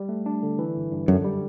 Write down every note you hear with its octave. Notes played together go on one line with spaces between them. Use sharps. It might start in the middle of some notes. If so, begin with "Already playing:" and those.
Already playing: G3
A3
D4
D3
E3
G1
G2
F#2 D3
G3